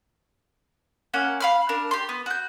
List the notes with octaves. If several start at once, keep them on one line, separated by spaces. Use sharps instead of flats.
A#3 C#4 F#5
F5 B5 F6
D4 A#4
G4 C6
B3
F#4 G6